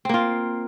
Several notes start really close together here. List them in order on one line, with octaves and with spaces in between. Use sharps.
C4 A#3 F4